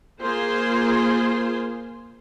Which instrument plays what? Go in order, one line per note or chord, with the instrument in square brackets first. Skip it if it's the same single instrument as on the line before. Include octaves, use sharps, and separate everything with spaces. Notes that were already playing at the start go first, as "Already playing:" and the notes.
[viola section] A#3 F4 G#4 C5 C6